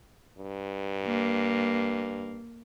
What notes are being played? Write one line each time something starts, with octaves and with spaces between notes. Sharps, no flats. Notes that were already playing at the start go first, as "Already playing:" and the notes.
G2
A#3